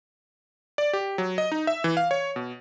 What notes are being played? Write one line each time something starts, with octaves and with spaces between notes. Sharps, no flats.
D5
G4
F#3
D#5
D#4
E5
E3
F5
C#5
B2